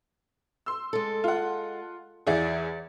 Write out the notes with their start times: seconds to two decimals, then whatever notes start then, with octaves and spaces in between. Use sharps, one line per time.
0.66 C6 E6
0.93 G#3 A4
1.24 F4 F#5
2.27 E2 E4 G#4 D5 F#5